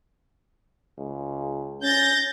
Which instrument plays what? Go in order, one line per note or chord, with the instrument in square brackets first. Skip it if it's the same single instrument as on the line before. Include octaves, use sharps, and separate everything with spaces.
[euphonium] C#2
[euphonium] C#4 [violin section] G6 A6 A#6